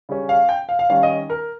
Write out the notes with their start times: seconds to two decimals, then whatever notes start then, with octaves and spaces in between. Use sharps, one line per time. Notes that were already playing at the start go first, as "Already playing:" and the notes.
0.09 C#3 G3 C#4
0.29 F5
0.49 G5
0.69 F5
0.79 F5
0.90 D#3 G3 C#4 F5
1.03 D#5
1.30 A#4